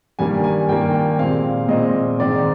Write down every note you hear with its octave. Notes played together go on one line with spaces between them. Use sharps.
G2 D#3 G3 A#3 G#5
G#5
G2 D#3 G3 A#3 G5
G5
A#2 G#3 C4 F5
A#2 G#3 C4 D#5
G#2 D#3 G#3 C4 D5